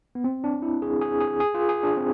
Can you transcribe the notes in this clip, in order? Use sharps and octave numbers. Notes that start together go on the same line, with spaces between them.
B3
C4
D4
E4
G#4
G#4
G#4
G#4
F4
G#4
D4
C4